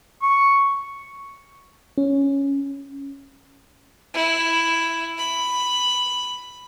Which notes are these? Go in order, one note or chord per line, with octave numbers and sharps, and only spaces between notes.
C#6
C#4
E4
B5